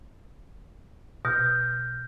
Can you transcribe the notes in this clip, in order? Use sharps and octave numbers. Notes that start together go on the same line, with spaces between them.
B2 F6 G6 A#6